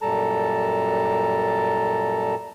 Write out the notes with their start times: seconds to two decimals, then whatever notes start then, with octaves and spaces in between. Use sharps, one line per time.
0.02 F#2 A#2 G3 A4 A5 A#5